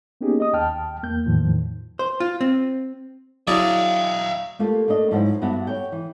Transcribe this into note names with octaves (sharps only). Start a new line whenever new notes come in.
A#3 B3 C#4 D#4 G4 G#4
D#5 D#6
D#2 G5 A5 F6
E2 A#3 G6
E2 A2 D#3 F3
C5
F4
C4
F#3 D4 E4 G#4 D5 E5 F5
A3 A#3 F4 G4
A3 A#3 D4 D#5
G#2 F3 F#3 E4 C5 F#5
G2 B3 D4 F#4 E5 F#5
C#5 G5
E3